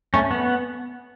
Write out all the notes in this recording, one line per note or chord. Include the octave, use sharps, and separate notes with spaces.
A3 C#4
B3